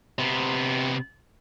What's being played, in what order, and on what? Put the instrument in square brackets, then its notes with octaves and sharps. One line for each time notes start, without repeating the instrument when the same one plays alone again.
[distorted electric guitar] C3 B3